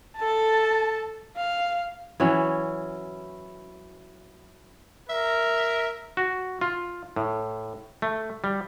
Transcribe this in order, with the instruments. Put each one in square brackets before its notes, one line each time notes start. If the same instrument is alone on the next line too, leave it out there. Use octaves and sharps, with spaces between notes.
[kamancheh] A4 A5
F5
[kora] E3 F#3 C#4
[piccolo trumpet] A#4 [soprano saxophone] E5
[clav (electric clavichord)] F#4
F4
A2
A3
G3